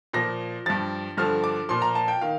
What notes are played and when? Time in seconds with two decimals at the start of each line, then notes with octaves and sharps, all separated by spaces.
0.13 A#2 F3 A#6
0.66 G2 F3 A6
1.17 G2 D3 F3 F6
1.44 D6
1.69 A#2 F3 C6
1.82 A#5
1.95 A5
2.08 G5
2.21 D#3 F5